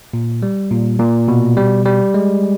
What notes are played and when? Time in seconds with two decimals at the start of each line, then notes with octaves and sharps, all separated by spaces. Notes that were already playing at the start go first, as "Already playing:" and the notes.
0.14 A#2
0.43 G3
0.71 A#2
0.99 A#2
1.28 B2
1.57 G3
1.85 G3
2.14 G#3